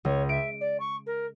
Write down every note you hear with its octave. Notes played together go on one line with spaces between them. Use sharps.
C#2 C#5
E5 D7
D5
C#6
A#4